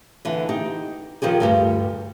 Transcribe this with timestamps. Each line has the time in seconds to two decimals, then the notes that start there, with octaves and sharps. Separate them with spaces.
0.25 D3 E3
0.49 D#4 G4
1.22 D#3 F3 G4 G#4
1.40 D2 G2 G4